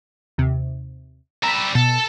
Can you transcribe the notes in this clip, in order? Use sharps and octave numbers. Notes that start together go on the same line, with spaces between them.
D#2 C3
G3 E5 A#5 B5
B2 A4